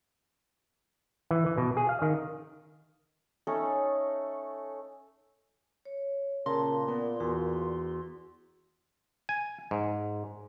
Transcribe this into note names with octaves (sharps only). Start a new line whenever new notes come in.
E3
E3
B2
G#4
F5
D#3
A3 C#4 D#4 A4
C#5
A#2 C#3 A#4 A5 A#5 C6
B3 A#4
E2 F#4
G#5
G#2